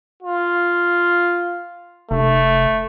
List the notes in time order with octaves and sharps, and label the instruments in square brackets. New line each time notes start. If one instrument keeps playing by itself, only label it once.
[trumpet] F4
[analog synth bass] F1 [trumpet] A3